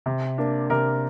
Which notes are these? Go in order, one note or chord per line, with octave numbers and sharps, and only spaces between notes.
C3
A#3 D4
C3 A#4